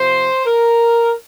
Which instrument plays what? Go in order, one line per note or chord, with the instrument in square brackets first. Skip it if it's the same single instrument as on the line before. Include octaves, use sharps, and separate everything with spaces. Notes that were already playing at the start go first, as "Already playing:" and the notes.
Already playing: [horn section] C3 F3 C5
A#4